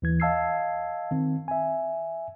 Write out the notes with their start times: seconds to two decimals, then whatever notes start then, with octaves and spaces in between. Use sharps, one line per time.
0.02 D#2 E3 G#6
0.20 D#5 F5 A5 E6 G#6 C7
1.11 D#3 C4
1.48 E5 G#5